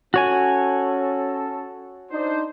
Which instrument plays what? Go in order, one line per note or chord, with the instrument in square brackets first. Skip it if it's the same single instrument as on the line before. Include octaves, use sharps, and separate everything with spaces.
[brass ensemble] C#4 A4 [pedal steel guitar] F#4 C#5 G#5
[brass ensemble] D4 D#4 C5